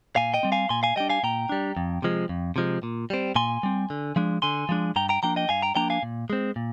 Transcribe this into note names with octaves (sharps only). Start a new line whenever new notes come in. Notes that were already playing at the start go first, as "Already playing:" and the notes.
A#2 F5 G#5
D#5 G5
G3 C4
F5 G#5
A#2 G#5 C6
F5 G#5
G3 D4 D#5 G5
F5 G#5
A#2 G5 A#5
G3 D4
F2
C3 F3 G#3
F2
C3 F3 G#3
A#2
G3 C4
A#2 G#5 C6
G3 C4
D3
F3 G#3 D4
D3 G#5 C6
F3 G#3 D4
G2 G5 A#5
G5 A#5
F3 A#3 D4 G5 A#5
D#5 G5
G2 F5 G#5
G5 A#5
F3 A#3 D4 G5 A#5
F5 G#5
A#2
G#3 C4
A#2